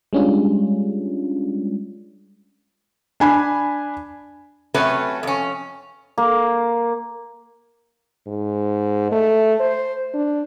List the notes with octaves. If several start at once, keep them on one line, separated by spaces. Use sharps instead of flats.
G3 G#3 C#4 D4 F4
D4 G#5 B5
C3 F#3 A3 C#4 B4
F2 C#4
A#3
G#2
A3
C5
D4